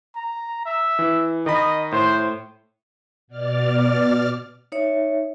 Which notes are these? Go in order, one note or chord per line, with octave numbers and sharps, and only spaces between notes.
A#5
E5
E3
D#3 D#5 B5
A2 C5
B2 D5 F6 A6
D#4 C#5 E5